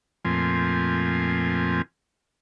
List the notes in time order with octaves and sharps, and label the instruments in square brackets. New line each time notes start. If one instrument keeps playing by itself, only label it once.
[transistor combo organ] F2 A#2 F3 A3 C4 G#5